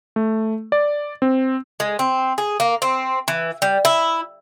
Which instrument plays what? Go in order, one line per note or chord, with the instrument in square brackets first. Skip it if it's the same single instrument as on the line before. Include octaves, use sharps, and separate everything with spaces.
[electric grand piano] A3
D5
C4
[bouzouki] G#3
C4
G#4
A#3
C4
E3
G3
E4